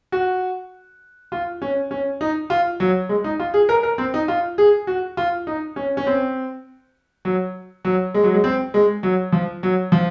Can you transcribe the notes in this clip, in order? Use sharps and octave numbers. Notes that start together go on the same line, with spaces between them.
F#4
F4
C#4
C#4
D#4
F4
F#3
G#3
D#4
F4
G#4
A#4
A#4
C4
D#4
F4
G#4
F#4
F4
D#4
C#4
C#4
C4
F#3
F#3
G#3
F#3
G#3
C4
G#3
F#3
F3
F#3
F3